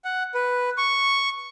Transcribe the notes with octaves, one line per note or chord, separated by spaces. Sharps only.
F#5
B4
C#6